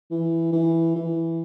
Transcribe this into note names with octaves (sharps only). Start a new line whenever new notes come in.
E3
E3
E3